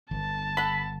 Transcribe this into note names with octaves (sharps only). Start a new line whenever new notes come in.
G1 A5
A4 F#5 B5